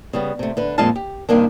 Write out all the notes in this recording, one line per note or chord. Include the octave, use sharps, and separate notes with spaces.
C#3 G3 B3
C3 A3
D3 B4
F2 A#2 G#3 D#5 F5 A5
G4
G2 C3 D#3 A#3 D4